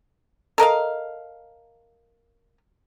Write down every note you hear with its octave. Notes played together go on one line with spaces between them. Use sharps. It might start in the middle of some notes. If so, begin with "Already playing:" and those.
A4 A#4 D#5 F5